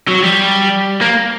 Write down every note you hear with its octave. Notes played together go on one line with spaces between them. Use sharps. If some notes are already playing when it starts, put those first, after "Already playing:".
F#3
G3
A#3